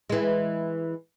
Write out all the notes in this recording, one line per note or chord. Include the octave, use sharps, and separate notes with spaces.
E3 G#3